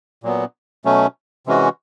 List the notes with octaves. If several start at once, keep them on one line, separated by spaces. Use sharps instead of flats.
A#2 F#3 B3
B2 F#3 A3 C#4
C3 E3 G#3 C#4 F#4